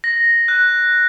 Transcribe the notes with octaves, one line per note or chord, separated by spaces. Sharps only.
A#6
F#6